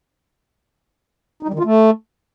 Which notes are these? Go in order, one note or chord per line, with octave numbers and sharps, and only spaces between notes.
D#4
G3
D#3
F4
A3